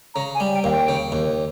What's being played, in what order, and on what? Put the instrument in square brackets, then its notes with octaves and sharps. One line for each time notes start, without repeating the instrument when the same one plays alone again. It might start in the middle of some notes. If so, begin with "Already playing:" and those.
[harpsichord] C#3 [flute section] A#5
[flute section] G#5
[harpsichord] G3
[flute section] G5
[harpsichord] D#2 [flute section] F5
[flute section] G5
[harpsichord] C#3
D#2